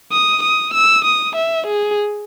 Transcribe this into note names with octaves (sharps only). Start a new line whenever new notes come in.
D#6
D#6
E6
D#6
E5
G#4